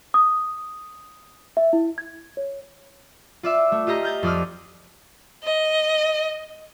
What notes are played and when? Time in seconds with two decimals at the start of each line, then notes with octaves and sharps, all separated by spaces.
0.14 D#6
1.57 E5
1.73 E4
1.98 G#6
2.37 C#5
3.43 F4 D5 E5
3.72 A3
3.87 F4 G4 D#5 A#5
4.03 F6 G6 A6
4.23 F2 D5 D#6 F6
5.43 D#5